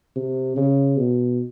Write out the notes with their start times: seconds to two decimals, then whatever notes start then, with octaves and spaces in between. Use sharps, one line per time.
0.16 C3
0.57 C#3
0.97 B2